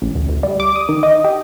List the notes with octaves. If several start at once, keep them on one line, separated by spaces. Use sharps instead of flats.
A1
D2
D2
G3
D6
D#6
D#3
D#5
G4